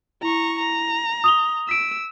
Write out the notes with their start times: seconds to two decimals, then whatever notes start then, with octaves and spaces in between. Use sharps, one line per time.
0.23 E4 A#5 C#6
0.59 A#5
1.24 D#6 F7 G7
1.69 E6 B6 D7